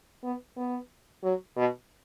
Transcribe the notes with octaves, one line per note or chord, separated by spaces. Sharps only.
B3
B3
F#3
B2